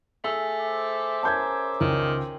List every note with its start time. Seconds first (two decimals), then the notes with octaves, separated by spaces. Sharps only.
0.24 A3 G#4 E6
0.61 C5 E5 D6
1.23 C#4 A#4 A5 G6 G#6
1.81 C#2 D#3 G5 C6